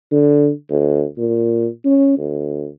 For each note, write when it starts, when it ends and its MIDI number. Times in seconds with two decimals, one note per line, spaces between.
0.11 0.50 50
0.70 1.04 38
1.18 1.67 46
1.85 2.14 61
2.18 2.68 38